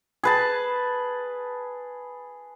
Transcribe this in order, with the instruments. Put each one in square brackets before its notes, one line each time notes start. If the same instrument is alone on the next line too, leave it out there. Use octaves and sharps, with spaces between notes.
[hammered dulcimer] G#4 B4 A5